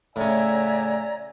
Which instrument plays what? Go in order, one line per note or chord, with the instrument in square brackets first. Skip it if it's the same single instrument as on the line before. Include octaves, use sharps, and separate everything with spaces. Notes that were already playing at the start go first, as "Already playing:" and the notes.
[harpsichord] A2 C#3 [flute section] C#5 D5 A#5 [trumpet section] E5 F#5 G#5